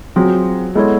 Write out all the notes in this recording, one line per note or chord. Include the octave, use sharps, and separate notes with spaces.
F#3 C4 F4 G#4
G#3 B3 E4 A4 C#5